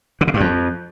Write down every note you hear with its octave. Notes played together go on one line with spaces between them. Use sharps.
D3
C#3
G2
F2